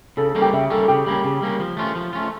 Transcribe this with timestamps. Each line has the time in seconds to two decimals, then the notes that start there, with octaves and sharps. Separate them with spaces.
0.17 C#3 A4
0.29 A4
0.35 G3 A#3 C#4
0.42 G4
0.53 C#3 E5
0.70 G3 A#3 C#4 A4
0.88 C#3 G4
1.06 G3 A#3 C#4
1.24 C#3
1.42 G3 A#3 C#4
1.60 F3
1.77 A3 C#4 F4
1.95 F3
2.13 A3 C#4 F4